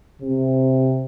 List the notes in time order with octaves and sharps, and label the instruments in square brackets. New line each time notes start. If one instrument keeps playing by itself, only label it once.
[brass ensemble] C3